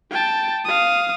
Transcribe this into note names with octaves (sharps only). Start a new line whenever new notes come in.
G5 A5
F5 D#6